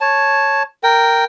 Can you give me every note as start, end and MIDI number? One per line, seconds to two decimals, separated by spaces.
0.01 0.63 73
0.01 0.63 81
0.83 1.25 70
0.83 1.25 79